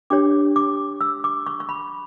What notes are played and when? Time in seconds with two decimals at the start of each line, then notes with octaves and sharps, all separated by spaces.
0.10 D4 G4 C#5 D6
0.56 D6
1.01 E6
1.24 D6
1.47 C#6
1.60 C#6
1.69 B5